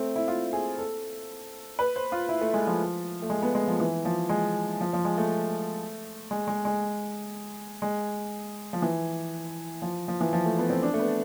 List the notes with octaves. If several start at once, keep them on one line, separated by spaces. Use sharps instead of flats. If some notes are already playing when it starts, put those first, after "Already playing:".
Already playing: A3 C4
E4
F4
G#4
A4
B4
C5
F4
E4
A3
G#3
F3
A3
G#3
B3
G#3
F3
E3
F3
G#3
F3
F3
G#3
A3
G#3
G#3
G#3
G#3
F3
E3
F3
F3
E3
F3
A3
B3
C4
D4
A3
B3